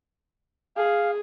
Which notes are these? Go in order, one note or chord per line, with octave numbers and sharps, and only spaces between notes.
G#4 F5